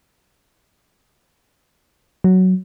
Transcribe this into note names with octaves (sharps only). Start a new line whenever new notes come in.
F#3